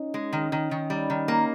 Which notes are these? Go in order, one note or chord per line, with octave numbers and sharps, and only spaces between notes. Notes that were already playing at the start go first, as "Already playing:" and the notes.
Already playing: C#4 D#4
G#3
D#3
D#3
D#3
G3
D#3
A#3